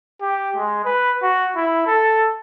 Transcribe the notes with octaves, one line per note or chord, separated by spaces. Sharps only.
G4
G#3
B4
F#4
E4
A4